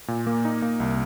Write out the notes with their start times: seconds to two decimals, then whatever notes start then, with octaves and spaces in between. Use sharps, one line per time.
0.08 A#2
0.27 A#3
0.45 D#4
0.62 A#3
0.80 C2